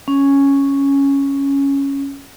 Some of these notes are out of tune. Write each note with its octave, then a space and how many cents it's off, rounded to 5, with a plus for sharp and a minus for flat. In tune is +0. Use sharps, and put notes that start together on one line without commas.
C#4 +0